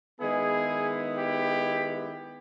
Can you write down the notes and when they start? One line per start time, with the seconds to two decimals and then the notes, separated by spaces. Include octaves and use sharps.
0.20 D#3 G#3 B3 E4 G#4
1.17 G4